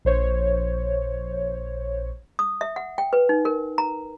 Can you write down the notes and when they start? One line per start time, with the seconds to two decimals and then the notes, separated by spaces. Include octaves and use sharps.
0.05 A#1 C5 C#5
2.39 D#6
2.61 E5
2.76 F#5
2.98 G5
3.13 B4
3.29 D#4
3.45 A#4
3.78 A#5